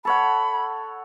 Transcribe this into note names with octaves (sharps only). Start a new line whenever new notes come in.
A4 C#5 F#5 B5